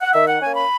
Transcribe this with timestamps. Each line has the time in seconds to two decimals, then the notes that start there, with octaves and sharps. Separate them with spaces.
0.02 F#5
0.13 D#3 E5
0.27 F#5
0.40 A#3 C#4 G#5
0.55 B5